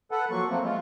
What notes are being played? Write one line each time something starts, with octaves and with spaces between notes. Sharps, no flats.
A4 B4 F#5
F3 F#3 A#3 C#6
F3 A3 A#3 C4
G#3 F4